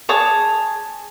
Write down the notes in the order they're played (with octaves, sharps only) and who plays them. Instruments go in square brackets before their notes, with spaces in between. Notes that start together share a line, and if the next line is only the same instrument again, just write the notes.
[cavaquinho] G#4 C#5 A5 D#6